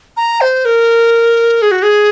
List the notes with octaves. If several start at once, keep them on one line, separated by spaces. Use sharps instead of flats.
A#5
C5
A#4
G#4
F#4
G#4